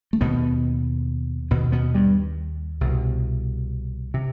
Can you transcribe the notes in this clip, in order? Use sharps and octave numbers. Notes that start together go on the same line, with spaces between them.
A3
D#2 B2 B3
D#2 B2 B3
B2 B3
G2 G3
C2 B2
C3